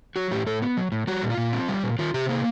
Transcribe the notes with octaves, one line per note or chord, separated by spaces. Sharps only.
F#3 F#4
A2 G4
A2 A4
B3
F#3
A2
G3 F#4
A#2
F4
A#2
C4
G3
A#2
D#3 F4
C3 G4
A#3 G#4